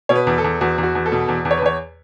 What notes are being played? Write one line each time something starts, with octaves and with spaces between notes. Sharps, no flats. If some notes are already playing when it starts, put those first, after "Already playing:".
B2 C#5
B4
E2
A4
E2
E2 F#4
E2
F#4
E2
A4
B2
E2
E2
C#5
B4
E2 C#5